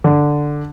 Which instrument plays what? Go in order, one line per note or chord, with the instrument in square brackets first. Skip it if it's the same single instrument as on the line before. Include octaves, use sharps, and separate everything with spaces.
[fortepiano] D3